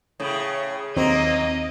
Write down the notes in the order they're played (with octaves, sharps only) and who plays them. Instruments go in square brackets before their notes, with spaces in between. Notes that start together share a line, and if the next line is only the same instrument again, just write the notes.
[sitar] A2 C#3
[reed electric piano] D#2 C4 [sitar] F#3 A#3 [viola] D#5